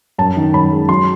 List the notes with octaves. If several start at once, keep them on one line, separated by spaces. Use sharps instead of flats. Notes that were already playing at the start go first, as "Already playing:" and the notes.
F#2 A5
D#3
F#2 B5
G#3
F#3 C6